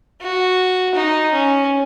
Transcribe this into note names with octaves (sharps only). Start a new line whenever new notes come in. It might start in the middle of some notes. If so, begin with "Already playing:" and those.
F#4
D#4
C#4